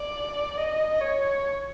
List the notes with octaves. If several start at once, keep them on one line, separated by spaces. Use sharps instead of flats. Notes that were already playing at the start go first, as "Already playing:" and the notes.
Already playing: D5
D#5
C#5